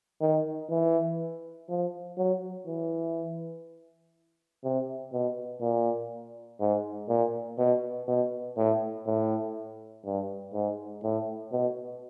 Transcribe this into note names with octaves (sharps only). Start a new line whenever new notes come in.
D#3
E3
F3
F#3
E3
C3
B2
A#2
G#2
A#2
B2
B2
A2
A2
G2
G#2
A2
B2